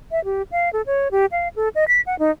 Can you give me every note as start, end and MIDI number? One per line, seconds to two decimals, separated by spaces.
0.11 0.23 76
0.25 0.42 67
0.52 0.72 77
0.73 0.82 69
0.86 1.08 73
1.11 1.26 67
1.32 1.48 77
1.56 1.69 69
1.75 1.85 75
1.88 2.01 95
2.06 2.18 78
2.19 2.31 63